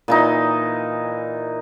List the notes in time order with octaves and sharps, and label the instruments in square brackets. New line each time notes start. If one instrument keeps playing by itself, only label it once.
[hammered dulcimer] A#2 E3 D#4